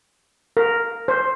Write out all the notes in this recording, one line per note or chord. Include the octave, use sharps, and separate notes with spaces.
A#4
C5